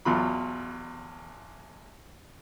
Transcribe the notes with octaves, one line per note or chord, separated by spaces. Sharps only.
A1 E2 F#3 F4 B5